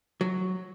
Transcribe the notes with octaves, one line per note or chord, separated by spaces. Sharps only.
F#3